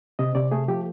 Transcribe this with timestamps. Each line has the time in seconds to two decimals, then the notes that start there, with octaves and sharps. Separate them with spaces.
0.19 C3 D#5
0.35 C3 D5
0.51 A3 G#4
0.68 F3 G4